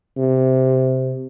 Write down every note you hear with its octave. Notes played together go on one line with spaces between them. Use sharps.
C3